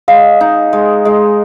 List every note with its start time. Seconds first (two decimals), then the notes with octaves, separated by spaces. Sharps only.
0.08 G#3 F5
0.41 D#4
0.73 G#3
1.05 G#3